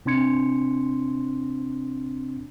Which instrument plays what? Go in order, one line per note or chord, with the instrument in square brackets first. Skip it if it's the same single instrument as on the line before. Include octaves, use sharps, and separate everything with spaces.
[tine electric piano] C3 C4 D4 C6 G#6 C#7